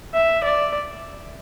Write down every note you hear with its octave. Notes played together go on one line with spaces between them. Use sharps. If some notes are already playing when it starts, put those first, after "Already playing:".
E5
D5